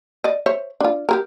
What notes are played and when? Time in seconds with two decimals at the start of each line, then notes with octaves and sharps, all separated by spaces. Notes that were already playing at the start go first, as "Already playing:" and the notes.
0.24 D5 D#5
0.46 C5 C#5 E5
0.81 D4 F4
1.09 G4 G#4 A#4